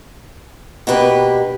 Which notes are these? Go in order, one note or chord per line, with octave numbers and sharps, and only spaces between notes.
B2 A#3 D4 G4 B4